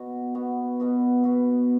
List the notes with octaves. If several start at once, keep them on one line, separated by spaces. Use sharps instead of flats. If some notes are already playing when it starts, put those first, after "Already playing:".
Already playing: B2 B3 F#4
B2 B3 F#4
B2 B3 F#4
B2 B3 F#4